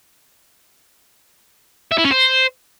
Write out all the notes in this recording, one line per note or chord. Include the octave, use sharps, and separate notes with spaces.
E5
E4
C#4
C5